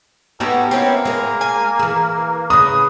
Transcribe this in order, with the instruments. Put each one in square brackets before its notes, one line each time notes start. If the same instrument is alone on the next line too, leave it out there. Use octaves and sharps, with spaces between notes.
[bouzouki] G3 G#3 G4 [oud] B3 D#4 F#4 [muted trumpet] A4
[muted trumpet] A#3 [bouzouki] C4 C#4 E4
[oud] G#3 [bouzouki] G#4 A#4
[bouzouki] G#5
[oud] E3 G#4
[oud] C#3 G#3 [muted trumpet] B4 [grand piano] D#6